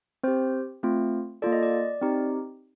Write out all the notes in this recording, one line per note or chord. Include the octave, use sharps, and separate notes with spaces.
C4 G4 C5
A3 C4 F4
A#3 F4 A4 D5
D#5
D5
C4 D#4 G4